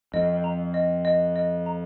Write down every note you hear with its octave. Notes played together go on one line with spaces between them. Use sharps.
F2 D#5
A#5
D#5
D#5
D#5
A#5